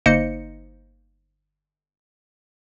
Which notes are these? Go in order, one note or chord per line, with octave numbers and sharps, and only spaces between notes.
G1 A#3 D#4 C5 D#5 C#7